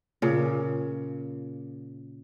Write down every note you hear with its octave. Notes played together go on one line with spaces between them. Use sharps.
A#2 C#3